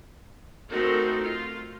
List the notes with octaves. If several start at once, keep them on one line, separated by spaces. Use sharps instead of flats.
A3 C4 D#4 F#4 A#4
F4